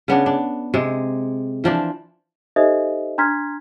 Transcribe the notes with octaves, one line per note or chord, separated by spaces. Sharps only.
C#3 B3 D4
D4
C3 G#3
E3 F3 D4
D#4 G4 A4 C5 D#5 E5
D4 A#5 C6 F6 G#6 B6